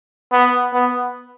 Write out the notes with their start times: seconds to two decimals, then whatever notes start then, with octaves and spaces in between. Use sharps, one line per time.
0.32 B3
0.73 B3